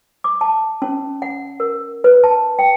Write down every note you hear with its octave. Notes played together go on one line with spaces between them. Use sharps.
D6
A5
C#4
F#5
A#4
B4
A5
G5